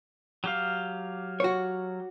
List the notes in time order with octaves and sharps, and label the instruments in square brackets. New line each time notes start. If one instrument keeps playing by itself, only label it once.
[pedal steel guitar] F#3 G4 F5
[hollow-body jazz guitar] F#4 C#5